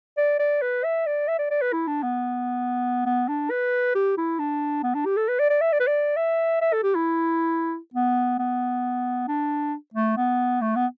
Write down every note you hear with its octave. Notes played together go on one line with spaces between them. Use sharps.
D5
D5
B4
E5
D5
E5
D5
D5
B4
E4
D4
B3
B3
D4
B4
G4
E4
D4
B3
D4
G4
A4
B4
D5
D5
E5
D5
B4
D5
E5
E5
A4
G4
E4
B3
B3
D4
A3
B3
A3
B3